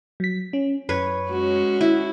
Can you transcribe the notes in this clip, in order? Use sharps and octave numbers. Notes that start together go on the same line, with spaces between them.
F#3 B6
C#4
F#2 B4 C#5
G#3 C#4 F#4
E4